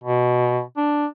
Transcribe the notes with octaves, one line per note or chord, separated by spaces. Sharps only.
B2
D4